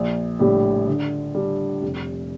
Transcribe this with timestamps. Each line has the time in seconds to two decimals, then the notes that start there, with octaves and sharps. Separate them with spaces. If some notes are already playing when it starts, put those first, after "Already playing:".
Already playing: A#1
0.39 A2 G3 D4 G4
0.88 D3
1.35 G3 D4
1.82 F1